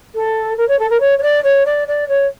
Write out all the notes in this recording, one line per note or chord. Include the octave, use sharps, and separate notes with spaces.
A4
A#4
C#5
A4
A#4
C#5
C#5
D5
C#5
D5
D5
C#5